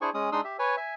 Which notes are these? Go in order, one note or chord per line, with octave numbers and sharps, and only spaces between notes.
D4 E4 G#4 C5 G#5 C#6
G#3 C#4 D#6
G#3 D4 D#4 C6 D#6 E6
G4 E5
B4 C#5 G#5
E5 G#5